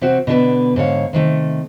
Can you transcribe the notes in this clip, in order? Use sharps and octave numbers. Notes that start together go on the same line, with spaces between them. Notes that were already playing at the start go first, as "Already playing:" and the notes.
C3 C4 F#4
B2 D3 D4 A#4 B4
G#2 D3 C#5 F5
C3 D#3 A3